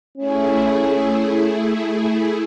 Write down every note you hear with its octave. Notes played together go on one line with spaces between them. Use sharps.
A3 C#4 E4 G#4